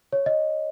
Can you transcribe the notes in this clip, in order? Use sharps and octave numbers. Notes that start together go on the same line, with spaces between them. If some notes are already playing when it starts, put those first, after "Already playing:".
C#5
D#5